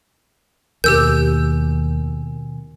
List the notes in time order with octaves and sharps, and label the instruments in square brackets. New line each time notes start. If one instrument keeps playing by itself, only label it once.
[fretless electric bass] D#2 [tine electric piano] B2 D#3 G#5 [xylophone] G4 E6 G6 [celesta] A#4